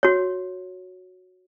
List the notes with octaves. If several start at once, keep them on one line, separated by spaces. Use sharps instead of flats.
F#4 C#5